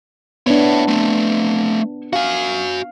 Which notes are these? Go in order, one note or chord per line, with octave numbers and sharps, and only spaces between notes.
B3 D4 E4 C#5
A3 C4
F#4 F5 G#5